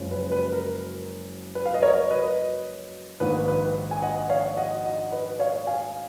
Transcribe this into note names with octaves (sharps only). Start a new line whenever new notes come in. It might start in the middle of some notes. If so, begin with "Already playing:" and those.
Already playing: F#1 F#2 F3 G#3 C#4
B4
B4
A#4
B4
F5
D#5
A#4 C#5
B4 D#5
A#1 G#2 D#3 A#3 D#4 B4
B4
G#5
D#5 F#5
C#5 F5
D#5 F#5
D#5 F#5
B4 D#5
C#5 F5
F5 G#5